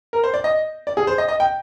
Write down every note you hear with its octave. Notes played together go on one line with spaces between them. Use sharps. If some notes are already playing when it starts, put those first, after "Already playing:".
A#4
C5
D5
D#5
D5
G#4
C5
D#5
D#5
G5